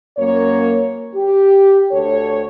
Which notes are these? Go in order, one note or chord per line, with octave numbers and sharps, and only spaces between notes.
F#2 A#3 C#5
G4
D2 A4 C#5